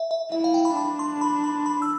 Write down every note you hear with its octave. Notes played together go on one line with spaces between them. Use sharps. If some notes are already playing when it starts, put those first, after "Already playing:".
Already playing: E5
E5
E4 E5
F5
G5
B5
D4 B5
C6
B5
B5
B5
E6